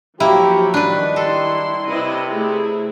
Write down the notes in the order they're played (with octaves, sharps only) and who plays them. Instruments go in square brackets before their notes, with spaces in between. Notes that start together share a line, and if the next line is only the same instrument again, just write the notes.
[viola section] F3 F#3 F#4 [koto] A#3 E4 [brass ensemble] G4
[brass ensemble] D#3 G3 [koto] D4 B4
[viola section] E4 C6 [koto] A4
[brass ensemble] C3 [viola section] E4 B4 D#5
[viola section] A3 E4 G#4